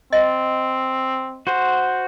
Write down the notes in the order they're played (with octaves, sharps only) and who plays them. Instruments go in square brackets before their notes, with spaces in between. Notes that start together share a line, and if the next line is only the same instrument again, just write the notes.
[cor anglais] C4 [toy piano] D#5
[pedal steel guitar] F#4 C5